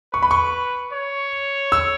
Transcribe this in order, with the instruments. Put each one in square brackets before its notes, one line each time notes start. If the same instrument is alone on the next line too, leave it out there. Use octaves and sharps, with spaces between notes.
[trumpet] B4 [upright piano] C#6
[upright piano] B5
C#6
[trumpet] C#5
[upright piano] E6